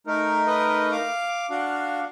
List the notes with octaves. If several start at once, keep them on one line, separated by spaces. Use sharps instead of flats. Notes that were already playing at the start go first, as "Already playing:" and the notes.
A3 D#4 A#4
B4 D#5
F5 D6
D4 F#4 F5